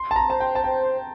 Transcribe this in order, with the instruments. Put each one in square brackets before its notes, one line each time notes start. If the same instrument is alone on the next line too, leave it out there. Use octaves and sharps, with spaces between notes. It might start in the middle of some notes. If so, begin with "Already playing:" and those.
Already playing: [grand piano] C6
A5
A#5
[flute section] C5 [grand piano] A5
[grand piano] G5
A5
[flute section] C5 [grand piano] G5